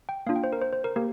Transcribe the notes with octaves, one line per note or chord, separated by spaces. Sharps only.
G5
A#3 D4 F4 F5
G5
C5
A#4
C5
C5
A#4
A#3 G4 A#4